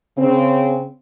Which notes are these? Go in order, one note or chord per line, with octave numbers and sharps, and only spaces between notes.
C#3 C4